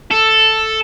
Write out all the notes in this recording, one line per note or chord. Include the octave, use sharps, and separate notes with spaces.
A4